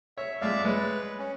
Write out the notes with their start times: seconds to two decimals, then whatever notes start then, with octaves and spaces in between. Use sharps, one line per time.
0.18 C#5 E5
0.41 F2 G#3 D5 E5 F5
0.65 G#3 B4 C#5
1.19 C#4